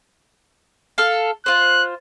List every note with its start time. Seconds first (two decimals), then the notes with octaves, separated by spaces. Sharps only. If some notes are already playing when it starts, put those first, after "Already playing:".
0.98 A4 F5
1.46 F4 C5 F#6